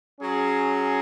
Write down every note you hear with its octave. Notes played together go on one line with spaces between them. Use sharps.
F#3 C#4 G#4